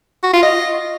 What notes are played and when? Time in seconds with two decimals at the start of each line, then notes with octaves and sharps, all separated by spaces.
0.23 F#4
0.33 F4
0.43 D#5